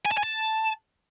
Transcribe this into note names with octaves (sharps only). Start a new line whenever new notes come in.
G#5
A5
G#5
A5